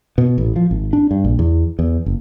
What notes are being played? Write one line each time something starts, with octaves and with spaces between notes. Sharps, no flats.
B2
A1
F3
G#1
D4
G2
A#1
E2
E2
F#1